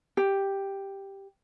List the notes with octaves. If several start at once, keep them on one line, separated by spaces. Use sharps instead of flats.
G4